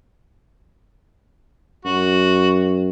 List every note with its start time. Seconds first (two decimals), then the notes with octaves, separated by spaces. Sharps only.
1.85 F#2 F#4